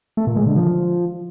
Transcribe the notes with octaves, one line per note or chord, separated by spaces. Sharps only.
A3
A#2
G#3
D3
F3